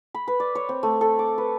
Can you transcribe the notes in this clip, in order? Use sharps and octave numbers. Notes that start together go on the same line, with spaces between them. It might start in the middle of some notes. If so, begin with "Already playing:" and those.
B5
B4
D5
C#5
C4
A3
A4
D6
B4